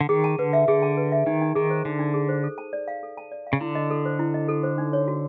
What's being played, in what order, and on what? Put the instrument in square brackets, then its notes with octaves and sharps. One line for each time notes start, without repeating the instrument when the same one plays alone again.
[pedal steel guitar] D3
[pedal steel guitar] D#3 [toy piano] G#4
[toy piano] A5
[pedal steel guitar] D3 [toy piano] B4
[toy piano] E5
[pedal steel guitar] D3 [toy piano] G#4
[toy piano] A5
B4
E5
[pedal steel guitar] D#3 [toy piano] D#4
[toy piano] D#4
[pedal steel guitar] D#3 [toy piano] G#4
[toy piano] C5
[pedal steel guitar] D3 [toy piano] D#4
[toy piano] D#4
G#4
C5
A4
A5
D5
F5
A4
A5
D5
F5
[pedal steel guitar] C#3
[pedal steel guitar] D3 [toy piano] E4
[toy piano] D#5
A4
C5
E4
D#5
A4
C5
D#4
C#5
F#4